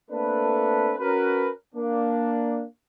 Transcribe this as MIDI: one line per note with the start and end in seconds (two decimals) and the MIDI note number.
0.11 0.94 57
0.11 0.94 58
0.11 0.94 60
0.11 0.94 62
0.11 0.94 69
0.11 0.94 71
0.99 1.49 61
0.99 1.49 66
0.99 1.49 70
0.99 1.49 71
1.75 2.63 58
1.75 2.63 62